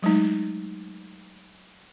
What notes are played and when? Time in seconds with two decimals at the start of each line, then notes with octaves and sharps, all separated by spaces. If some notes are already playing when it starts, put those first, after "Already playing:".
0.02 F#3 G#3 A3 D#4